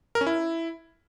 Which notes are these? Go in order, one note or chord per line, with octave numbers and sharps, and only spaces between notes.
A#4
C#4
E4